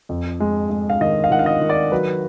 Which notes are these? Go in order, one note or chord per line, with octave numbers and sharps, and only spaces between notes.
F2
G#3
G#3
F5
D#3 D#5
F5
D#3 F#5
F5
D#5
D#3
D5
F#3 B4